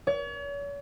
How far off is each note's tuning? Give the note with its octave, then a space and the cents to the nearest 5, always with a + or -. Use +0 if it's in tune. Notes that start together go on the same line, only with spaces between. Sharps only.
C#5 +40